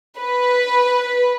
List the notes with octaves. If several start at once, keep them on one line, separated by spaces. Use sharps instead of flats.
B4